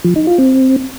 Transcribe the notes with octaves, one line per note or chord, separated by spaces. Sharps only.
F3
D#4
F4
C4